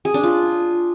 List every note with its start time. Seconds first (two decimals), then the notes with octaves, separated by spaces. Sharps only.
0.05 G#4
0.14 D4
0.23 F4